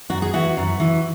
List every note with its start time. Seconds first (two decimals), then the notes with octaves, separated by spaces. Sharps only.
0.10 F#2 F#4
0.22 G#4
0.33 E3 F#4
0.57 F#2
0.80 E3